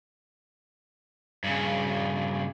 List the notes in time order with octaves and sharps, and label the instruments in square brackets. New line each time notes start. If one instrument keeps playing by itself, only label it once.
[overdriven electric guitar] G2 C#3